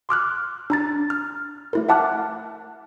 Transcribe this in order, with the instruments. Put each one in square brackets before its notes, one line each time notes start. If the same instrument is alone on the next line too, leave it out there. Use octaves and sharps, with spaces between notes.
[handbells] C6 D6 F6 F#6
D4 A#5 A6
F6
A3 E4 A#4
E5 F#5 A5 D6 F6 F#6